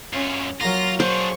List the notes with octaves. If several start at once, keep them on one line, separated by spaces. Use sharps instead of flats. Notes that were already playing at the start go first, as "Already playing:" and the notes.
F#2 C#4 F4
F#3 A#3 F4 A#6
D4 G#4 C5 C#6